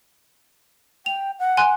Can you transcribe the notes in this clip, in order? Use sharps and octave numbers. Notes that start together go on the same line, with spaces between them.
G5 F7
F#5
G#5 C6 F#6